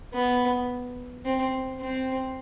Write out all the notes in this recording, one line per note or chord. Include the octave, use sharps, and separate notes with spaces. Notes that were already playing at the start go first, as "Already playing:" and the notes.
B3
C4
C4